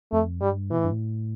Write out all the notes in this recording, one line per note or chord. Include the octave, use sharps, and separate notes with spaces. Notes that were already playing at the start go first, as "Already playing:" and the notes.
F2 A3
G2 G3
B2 E3
A2
G2
A2